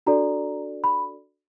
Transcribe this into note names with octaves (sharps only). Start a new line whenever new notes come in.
D4 F#4 A4 D5 A#5
B5